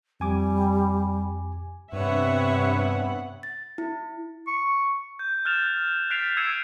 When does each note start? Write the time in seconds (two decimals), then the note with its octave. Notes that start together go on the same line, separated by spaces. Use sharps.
0.20 F2 G3 G#5 D6
1.93 G2 C3 B3 B4 C#5 E5 F#5
3.43 A6
3.78 E4
4.47 C#6
5.19 G6
5.45 F6 F#6 A6 E7 F7
6.10 F#6 A6 B6 C7 D7 F7
6.37 E6 G#6 C7 C#7 D#7 E7